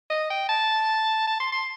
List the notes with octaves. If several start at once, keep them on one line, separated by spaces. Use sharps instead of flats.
D#5
G5
A5
A5
C6
C6